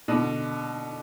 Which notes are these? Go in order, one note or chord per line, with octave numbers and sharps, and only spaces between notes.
B2 D3